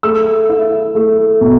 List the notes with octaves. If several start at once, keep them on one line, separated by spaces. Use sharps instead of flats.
A3 E6
E4
A3
B2